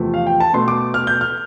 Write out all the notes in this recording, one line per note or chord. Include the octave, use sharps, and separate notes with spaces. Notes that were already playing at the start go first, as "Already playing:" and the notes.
Already playing: E2 C3 F3 A3
F5
G5
A5
B2 A3 C6
D6
F6
G6
F6